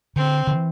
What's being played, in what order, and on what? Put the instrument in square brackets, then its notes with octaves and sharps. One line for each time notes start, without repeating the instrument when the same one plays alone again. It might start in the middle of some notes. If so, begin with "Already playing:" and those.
[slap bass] D3 [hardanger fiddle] C4
[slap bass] D3
E3